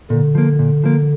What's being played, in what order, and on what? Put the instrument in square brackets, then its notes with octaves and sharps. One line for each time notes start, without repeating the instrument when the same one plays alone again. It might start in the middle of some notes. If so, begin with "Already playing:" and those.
[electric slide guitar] A#2 [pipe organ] D3
[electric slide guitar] F3 A#3
A#2
F3 A#3